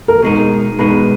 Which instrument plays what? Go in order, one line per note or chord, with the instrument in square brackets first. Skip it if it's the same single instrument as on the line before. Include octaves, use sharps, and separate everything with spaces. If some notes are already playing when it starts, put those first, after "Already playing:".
[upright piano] A#4
[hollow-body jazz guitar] B2 G#3 D#4
[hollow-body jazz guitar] B2 G#3 D#4 [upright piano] B4